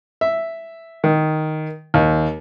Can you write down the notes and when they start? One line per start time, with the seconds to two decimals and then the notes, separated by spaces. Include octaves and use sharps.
0.21 E5
1.04 D#3
1.94 D#2